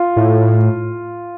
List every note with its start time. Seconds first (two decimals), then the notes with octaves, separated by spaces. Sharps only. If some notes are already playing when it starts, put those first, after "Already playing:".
Already playing: F4
0.16 A2